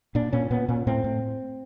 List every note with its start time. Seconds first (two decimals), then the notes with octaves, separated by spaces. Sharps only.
0.15 A#2 D4
0.33 A#2 C#4
0.50 A#2 B3
0.69 A#2 C#4
0.87 A2 C4
1.04 A2